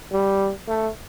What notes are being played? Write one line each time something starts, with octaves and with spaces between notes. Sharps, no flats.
G3
A3